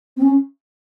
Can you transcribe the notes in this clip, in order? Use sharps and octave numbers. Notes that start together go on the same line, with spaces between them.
C4
C#4